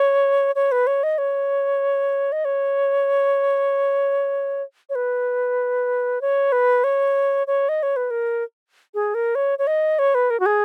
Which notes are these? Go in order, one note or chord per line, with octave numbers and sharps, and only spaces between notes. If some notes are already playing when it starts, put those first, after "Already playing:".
Already playing: C#5
C#5
B4
C#5
D#5
C#5
D#5
C#5
C#5
B4
C#5
B4
C#5
C#5
D#5
C#5
B4
A#4
G#4
A#4
C#5
C#5
D#5
C#5
B4
A#4
F#4
G#4